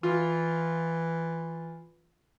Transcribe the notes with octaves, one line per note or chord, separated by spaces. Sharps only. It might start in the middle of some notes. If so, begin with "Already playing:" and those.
E3 F4